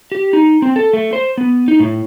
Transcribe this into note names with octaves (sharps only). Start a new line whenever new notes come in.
G4
D#4
C4
A4
A3
C5
B3
D#4
A2